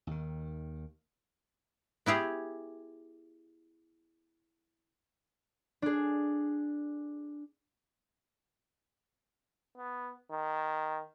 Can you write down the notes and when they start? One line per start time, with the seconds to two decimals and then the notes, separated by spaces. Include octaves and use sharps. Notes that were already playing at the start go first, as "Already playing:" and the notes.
0.07 D#2 D#3
2.06 B3 E4 G4 G#4
5.82 D4 G#4
9.77 B3
10.31 D#3